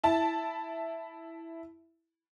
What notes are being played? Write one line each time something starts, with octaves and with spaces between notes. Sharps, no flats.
E4 A5